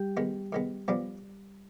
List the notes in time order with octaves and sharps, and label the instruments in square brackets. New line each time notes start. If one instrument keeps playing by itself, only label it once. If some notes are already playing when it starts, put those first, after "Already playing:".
Already playing: [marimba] G3 G4
[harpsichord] D#3 G#3 B3
D#3 G#3 B3
G2 F3 B3 D4